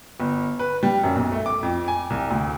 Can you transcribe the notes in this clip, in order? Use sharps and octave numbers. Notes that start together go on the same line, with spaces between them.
G1
B4
G3
F#2
B1
A3
D6
F2
G#5
C2
D2